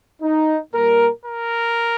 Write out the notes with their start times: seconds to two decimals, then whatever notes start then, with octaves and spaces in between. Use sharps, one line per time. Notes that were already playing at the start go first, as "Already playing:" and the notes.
0.22 D#4
0.73 A#2 G3 A#3 A#4
1.25 A#4